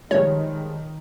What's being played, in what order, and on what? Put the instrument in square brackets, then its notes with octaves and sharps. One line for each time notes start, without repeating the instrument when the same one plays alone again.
[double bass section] D#3 [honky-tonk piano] F3 G3 G#3 [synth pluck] C#5